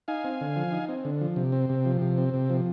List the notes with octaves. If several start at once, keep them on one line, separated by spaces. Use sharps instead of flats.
D#4 F5 G#5
C4
D3
F3
D#4
C4
D3
F3
C3
C4
C3
F3
C3
C4
C3
F3